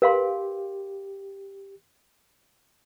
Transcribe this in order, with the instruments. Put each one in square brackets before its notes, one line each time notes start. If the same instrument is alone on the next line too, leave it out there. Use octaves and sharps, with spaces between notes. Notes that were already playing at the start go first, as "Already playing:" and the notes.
[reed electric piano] G4 [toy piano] A#4 F5 C6 [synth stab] B4